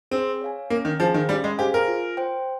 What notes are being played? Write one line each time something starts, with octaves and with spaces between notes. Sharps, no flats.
C4 G#4
C#5 F5 G#5
A#3 C#4
D#3
F3 G#4 C5 F5 G#5
D#3
G3 C#4
G#3
G4 G#4 C5 F5 G#5
A#4
F4
C5 G5